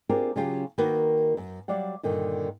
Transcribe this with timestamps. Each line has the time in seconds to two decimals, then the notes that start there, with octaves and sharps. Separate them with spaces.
0.09 C4 D4 F4 G4 G#4 A#4
0.36 C#3 F#3 C#4 F4 G4 G#4
0.78 D#3 A#3 F#4 A#4 B4
1.37 F#2
1.68 F#3 G3 D5 F5 F#5
2.03 G2 A#2 D3 D#3